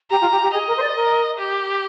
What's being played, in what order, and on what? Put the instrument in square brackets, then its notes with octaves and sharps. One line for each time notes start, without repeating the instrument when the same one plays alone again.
[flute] G4 [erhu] A#5
[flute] F4
G4
G4
[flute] G#4 [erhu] D#5
[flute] A#4
C5
D5
A#4
[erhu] G4